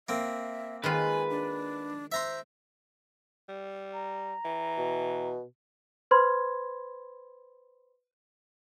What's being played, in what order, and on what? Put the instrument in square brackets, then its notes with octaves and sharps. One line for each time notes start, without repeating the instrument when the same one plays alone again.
[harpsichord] A#3 C4 [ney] E5
[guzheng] D#3 G#3 F4 [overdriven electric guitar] B4 [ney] G#5
[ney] D4
[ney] C5 [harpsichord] E5 A#5 C6
[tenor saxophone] G3
[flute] A#5
[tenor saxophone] E3
[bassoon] B2
[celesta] B4 C5 B5 C6 G#6